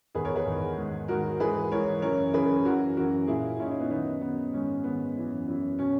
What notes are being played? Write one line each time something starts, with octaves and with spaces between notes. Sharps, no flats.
E2 D#3 G#4 B4
A#4 C#5
G#4 B4
E2 D#3
G#2 D#3
G#2 D#3 F#4 A#4
G#2 E3 G#4 B4
G#2 E3 A#4 C#5
F#2 C#3 E3 A#4 C#5
F#2 C#3 E3 G#4 B4
F#2 E3 F#4 A#4
F#2 E3 F#4 A#4
A#2 E4 G#4
A#2 C#4 E4
D#4
C#4 E4
B3 D#4
F#2 D#3 B3 D#4
F#2 D#3 B3
G#2 D#3 C#4
G#2 D#3 B3
F#2 E3
F#2 E3
B2 C#4